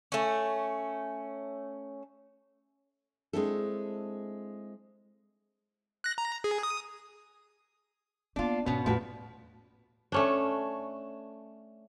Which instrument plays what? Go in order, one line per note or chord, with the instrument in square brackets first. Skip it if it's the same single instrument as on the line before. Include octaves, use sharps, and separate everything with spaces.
[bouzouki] A3 C#4
[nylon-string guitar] G#3 A3 C4 D4 E4 A4
[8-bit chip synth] F#6 A#6
A#5
G#4
D#6
[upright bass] A#3 B3 [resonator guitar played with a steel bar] D4 F4
[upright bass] G#2 D#3 [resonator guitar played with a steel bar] B2 B3 [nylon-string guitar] C#4
[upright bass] E2 [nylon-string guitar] A2 G3 F#4 [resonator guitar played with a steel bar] F3 B4
[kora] A3 C#4 D4